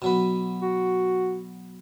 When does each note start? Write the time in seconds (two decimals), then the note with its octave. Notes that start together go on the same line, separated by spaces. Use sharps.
0.02 B2 F#3 B4
0.62 F#4